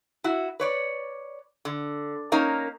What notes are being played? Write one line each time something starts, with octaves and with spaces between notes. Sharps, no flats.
E4 F#4
B4 C#5 D5
D3
A#3 C#4 D#4 A#4